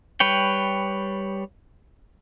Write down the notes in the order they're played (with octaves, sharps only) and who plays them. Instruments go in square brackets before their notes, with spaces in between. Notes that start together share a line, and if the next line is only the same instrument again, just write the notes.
[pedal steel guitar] G3 B4 C#5 G5